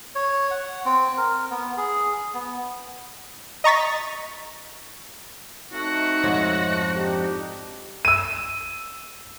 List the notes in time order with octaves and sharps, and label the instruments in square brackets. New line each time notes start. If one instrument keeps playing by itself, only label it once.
[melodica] C#5
F#5
C4
A#4
B3
G#4
B3
[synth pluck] D#5 A#5 C#6 A6 B6
[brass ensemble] A3 C4 D#4 [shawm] F#4
[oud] F2 G#2 C#5
[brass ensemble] D4 D#4 G4
[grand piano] E6 D#7